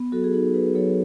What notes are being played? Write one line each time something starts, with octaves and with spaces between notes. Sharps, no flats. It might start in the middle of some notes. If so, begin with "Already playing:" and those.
Already playing: B3
F#3 F#4 A4
G#4
D#4 F#4 A4
D#4 G#4 B4
F#3 A4 C#5